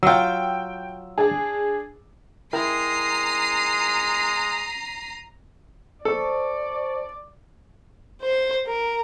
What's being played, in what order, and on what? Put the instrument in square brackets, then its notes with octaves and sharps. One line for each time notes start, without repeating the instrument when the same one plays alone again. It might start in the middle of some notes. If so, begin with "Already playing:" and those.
[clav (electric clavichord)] F#3 F4 [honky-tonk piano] G5 E6
[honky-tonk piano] D4 G#4
[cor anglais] G#3 [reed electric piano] E4 A#4 G5 [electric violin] A#5 [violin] C7 D#7
[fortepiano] A4 [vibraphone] C5 A5 C#6 [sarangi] D5
[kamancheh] C5
A#4